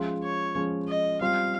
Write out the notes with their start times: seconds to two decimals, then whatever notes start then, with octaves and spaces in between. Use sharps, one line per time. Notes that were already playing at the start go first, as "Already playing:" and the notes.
Already playing: F3 G#3 C#4 F4
0.23 C#5
0.55 F3 G#3 C#4 F4
0.88 D#5
1.21 G3 C4 F4 F5